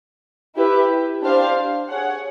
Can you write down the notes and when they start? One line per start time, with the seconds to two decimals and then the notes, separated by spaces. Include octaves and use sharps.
0.55 E4 G4 B4 E5
1.22 D4 G4 C5 F5
1.89 G#4 C#5 F#5